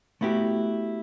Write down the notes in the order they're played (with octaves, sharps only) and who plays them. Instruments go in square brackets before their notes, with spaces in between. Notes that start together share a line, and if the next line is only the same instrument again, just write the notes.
[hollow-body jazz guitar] A3 B3 E4 F#4 G4